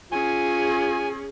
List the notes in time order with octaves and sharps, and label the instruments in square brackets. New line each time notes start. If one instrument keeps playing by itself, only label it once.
[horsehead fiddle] C#4 G#4 [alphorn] F4 [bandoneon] G#5